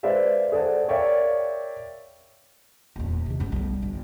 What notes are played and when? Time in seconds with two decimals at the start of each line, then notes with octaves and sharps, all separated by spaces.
0.03 G#3 B4 C5 D5 E5 F5
0.52 G#4 A4 C5 D5 F#5 A5
0.88 A#4 C#5 D5 E5 F5 G5
2.96 D#1 E2
3.26 C2 D#3
3.40 F#2 G#3
3.52 B1 G3
3.82 G1